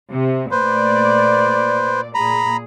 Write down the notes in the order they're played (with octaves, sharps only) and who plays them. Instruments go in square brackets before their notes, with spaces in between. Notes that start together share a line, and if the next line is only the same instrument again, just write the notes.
[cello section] C3
[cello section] A#2 A3 D5 [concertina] B4 C5
[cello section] A#2 G#4 [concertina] A#5 B5